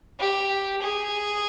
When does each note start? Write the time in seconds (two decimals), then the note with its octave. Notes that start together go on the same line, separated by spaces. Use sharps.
0.19 G4
0.81 G#4